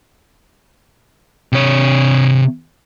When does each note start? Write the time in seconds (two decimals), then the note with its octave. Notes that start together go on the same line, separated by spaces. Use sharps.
1.53 C3 C#5